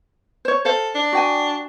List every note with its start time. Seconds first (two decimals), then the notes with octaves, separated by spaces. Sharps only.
0.45 C5 C#5
0.65 A4 C5 F5
0.95 D4
1.13 F#4 G5 G#5